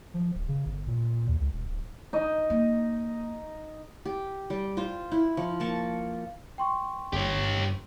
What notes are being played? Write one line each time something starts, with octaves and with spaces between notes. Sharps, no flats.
F3
D1
C#3
G1
A#2
D#2
C#2
D#1
D1
D#4 D#5
A#3
G4
G3
F4 C5
E4
F3
A#3 A5 C#6
G5 C6 C#6
G1 G4 C#5